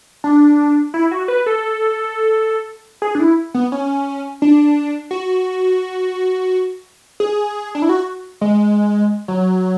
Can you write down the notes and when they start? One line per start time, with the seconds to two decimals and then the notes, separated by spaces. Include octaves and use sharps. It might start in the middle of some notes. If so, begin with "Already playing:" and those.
0.24 D4
0.94 E4
1.11 F#4
1.28 B4
1.46 A4
3.02 G#4
3.15 D4
3.20 E4
3.54 B3
3.72 C#4
4.42 D4
5.11 F#4
7.20 G#4
7.75 D4
7.82 E4
7.89 F#4
8.41 G#3
9.28 F#3